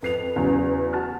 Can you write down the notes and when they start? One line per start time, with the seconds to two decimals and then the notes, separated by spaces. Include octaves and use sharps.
0.03 F2 B4 C7 F7
0.36 E2 C#3 F#3
0.93 F#4 A5 F6